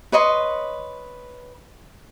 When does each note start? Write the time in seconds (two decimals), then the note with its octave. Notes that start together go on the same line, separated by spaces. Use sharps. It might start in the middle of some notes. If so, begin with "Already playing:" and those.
0.12 B4 C#5 D#5 C6